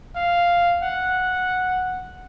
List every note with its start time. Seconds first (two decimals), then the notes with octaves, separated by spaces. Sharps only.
0.16 F5
0.82 F#5